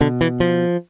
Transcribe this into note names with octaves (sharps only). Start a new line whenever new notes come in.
B2 D3
E3
F3